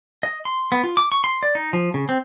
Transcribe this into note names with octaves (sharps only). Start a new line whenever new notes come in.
D#5
C6
B3
F4
D6
C#6
C6
D5
D#4
F3
C#3
C4